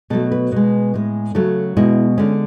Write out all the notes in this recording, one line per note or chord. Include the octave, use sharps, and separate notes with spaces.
B2 F#3 A3 A4
B4
B2 G#3
A2 G#3
C#3 F#3 A3 A4
B2 G#3 E4
D3 G#3 C#4